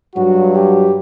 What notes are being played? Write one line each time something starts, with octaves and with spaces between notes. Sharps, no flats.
G2 F#3 F#4
G4